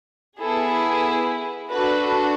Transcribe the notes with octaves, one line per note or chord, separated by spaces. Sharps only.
B3 E4 G#4 A4
D4 F#4 A4 B4